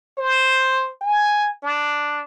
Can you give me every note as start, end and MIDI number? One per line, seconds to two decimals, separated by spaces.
0.18 0.91 72
1.01 1.52 80
1.63 2.23 62